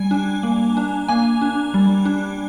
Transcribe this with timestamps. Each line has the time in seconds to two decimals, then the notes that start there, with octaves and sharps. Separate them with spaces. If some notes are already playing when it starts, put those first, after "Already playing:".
Already playing: G3 G#5
0.11 D4
0.43 A#3
0.77 D4
1.08 A#3 G#5
1.41 D4
1.74 G3
2.05 D4